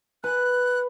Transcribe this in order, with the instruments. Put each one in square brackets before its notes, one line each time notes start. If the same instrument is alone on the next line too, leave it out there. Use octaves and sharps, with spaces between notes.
[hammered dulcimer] B4 [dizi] F#6